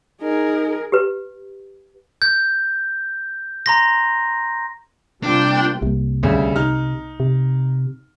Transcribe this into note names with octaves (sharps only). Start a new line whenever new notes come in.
D#4 G#4 A#4
G4 B4
G6
A#5 C6 A#6
C3 G3 A#3 D4 F4 G5
C2 C3 A#3
D2 C#3 G3
C3 D#4 F6
C3